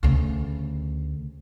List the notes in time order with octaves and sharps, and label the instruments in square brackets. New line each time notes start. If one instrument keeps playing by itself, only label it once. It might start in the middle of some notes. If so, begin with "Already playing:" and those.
[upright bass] D2 C#3